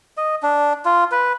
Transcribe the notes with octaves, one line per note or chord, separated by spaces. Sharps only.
D#5
D4
F4
B4